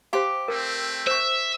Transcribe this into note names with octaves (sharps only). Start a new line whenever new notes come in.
G4 C5 F5 C6 D6
A3 C4 A#4
C5 E5 C#6